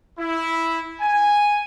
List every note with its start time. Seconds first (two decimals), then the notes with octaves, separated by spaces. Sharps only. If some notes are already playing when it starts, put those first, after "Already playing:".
0.19 E4
1.01 G#5